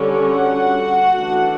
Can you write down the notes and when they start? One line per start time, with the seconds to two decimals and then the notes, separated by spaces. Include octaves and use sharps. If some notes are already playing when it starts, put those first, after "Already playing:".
Already playing: D3 G3 C#4
0.30 F#4 F#5
1.17 E3 A3 D4